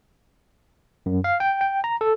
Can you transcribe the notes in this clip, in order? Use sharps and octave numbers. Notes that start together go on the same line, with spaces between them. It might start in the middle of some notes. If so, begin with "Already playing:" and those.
F#2
F5
G5
G5
A#5
A4